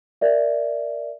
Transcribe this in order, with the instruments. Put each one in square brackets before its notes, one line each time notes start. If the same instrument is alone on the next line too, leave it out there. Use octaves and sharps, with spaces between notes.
[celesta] A#4 D5 E5